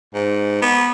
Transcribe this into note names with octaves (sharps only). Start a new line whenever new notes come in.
G#2
B3